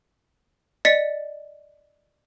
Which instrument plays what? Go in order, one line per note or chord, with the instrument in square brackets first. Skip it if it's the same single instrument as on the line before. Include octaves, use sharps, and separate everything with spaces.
[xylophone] D5 D#5 A6 B6 C#7